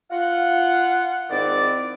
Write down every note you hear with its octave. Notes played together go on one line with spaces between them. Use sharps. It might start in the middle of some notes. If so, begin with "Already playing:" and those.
F4 F#5
G#2 D#3 C4 E4 D5